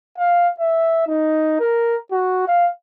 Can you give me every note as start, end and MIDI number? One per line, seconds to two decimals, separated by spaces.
0.18 0.49 77
0.60 1.04 76
1.07 1.58 63
1.60 1.96 70
2.12 2.44 66
2.48 2.68 77